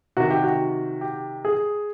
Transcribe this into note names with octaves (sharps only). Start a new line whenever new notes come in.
C3 D#3 F#4
G4
F#4
G4
G#4